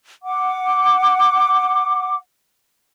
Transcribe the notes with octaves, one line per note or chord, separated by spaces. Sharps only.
F#5 D6